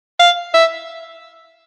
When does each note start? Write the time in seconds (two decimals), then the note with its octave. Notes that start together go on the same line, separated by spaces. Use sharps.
0.20 F5
0.54 E5